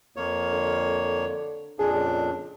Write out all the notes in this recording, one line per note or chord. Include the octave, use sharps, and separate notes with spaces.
F2 A#3 C#5
D3
F2 A#2 D4 G#4
C#3